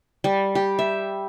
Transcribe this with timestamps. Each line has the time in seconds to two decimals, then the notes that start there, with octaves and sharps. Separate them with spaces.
0.24 G3
0.55 G4
0.79 E5